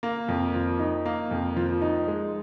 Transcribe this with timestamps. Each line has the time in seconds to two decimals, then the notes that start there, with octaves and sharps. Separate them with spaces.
0.03 A#3
0.28 F2
0.54 F3
0.79 D#4
1.05 A#3
1.31 F2
1.56 F3
1.82 D#4
2.08 G#3